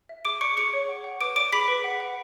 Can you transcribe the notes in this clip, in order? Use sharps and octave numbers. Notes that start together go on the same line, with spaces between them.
E5
G#4 D6 D7
D5 C#6 C#7
G#4 C#6 C#7
C#5
F#5
F#5
B4 D6 D7
D5 D6 D7
G#4 B5 B6
B4
F#5
F#5